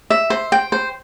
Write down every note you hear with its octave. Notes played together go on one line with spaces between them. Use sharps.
E5
C5
G5
C5